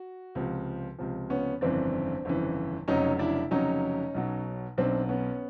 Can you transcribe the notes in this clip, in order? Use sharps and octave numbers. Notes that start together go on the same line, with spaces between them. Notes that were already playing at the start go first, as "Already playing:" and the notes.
Already playing: F#4
C#2 C3 F3
C#2 C3 F3
B3 C#4
G1 F2 C#3 E3 C4 D4
G1 F2 C#3 E3
F1 F2 C#3 F#3 C#4 D#4
D4 E4
F1 F2 C#3 F#3 C#4 D#4
B1 B2 F#3
B1 B2 F#3 C4 D4
B3 C#4